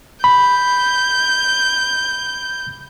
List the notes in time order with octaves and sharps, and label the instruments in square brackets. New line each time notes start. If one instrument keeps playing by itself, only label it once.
[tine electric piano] B5 [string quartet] G6